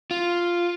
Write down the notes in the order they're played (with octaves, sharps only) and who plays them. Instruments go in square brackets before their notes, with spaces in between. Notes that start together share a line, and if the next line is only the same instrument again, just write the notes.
[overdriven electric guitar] F4